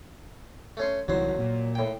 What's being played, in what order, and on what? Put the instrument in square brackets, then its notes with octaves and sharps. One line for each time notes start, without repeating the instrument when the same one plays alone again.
[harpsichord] A3 C#4 C6
[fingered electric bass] C2 D3 E3 [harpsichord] F#3 C5
[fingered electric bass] A#2
[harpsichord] A2 G5